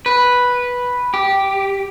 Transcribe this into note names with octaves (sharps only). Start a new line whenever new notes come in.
B4
G4